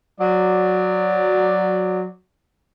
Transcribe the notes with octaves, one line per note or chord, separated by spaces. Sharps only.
F#3 D5